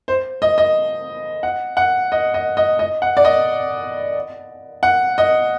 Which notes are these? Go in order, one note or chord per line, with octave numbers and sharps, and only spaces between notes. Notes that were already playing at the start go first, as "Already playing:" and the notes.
C5
D#5
D#5
F#5
F#5
D#5
D#5
D#5
D#5
F#5
D5
D#5
F#5
D#5